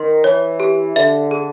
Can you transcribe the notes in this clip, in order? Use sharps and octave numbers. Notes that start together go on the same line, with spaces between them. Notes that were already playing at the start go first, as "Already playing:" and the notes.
Already playing: D#3 C6
E3 C#5
G4
D3 E5
G#4